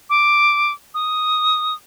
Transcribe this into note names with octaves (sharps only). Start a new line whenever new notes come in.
D6
D#6